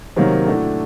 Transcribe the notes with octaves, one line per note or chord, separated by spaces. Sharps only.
C3 D#3 F#3 A#3
A2 A3 D4 F#4